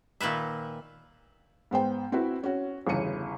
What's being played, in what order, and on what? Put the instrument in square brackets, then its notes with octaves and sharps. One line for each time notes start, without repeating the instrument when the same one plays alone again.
[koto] A#2 D#3 B4 E5
[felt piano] G#2 B3 C5 G5
C4 E4 F#4 B4
C#4 F#4
G1 E2 C#3 C#7 D#7